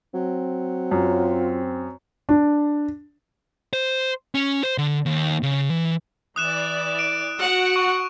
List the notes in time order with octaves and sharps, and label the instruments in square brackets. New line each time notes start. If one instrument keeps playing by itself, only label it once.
[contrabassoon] F#3 [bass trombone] C4
[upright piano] F#2 [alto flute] F4
[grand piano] D4
[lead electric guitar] C5
C#4
C5
D3
D#2
C#3
E3
[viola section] E3 D5 [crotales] D#6 F#6 E7
[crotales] D7 E7
[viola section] F#4 F#5
[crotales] C#6